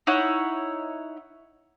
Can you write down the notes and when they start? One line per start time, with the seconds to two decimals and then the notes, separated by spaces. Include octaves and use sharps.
0.07 D#4 E4 C#5 F#5